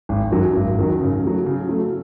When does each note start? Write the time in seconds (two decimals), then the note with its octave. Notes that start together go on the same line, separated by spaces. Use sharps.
0.09 G#1
0.31 F#2 D#3 F#3
0.55 G#1
0.77 F#2 D#3 F#3
1.01 C#3
1.23 F#3 A3
1.46 C#3
1.69 F#3 A3